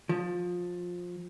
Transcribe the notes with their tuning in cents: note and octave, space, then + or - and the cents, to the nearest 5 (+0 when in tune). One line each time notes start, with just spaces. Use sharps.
F3 +20